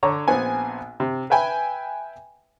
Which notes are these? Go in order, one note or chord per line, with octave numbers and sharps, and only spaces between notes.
D3 C#5 A#5 C#6
A#1 B3 C4 G#5
C3
B4 E5 G5 G#5 B5